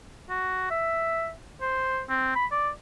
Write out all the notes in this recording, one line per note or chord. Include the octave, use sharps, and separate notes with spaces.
F#4
E5
C5
C4
B5
D5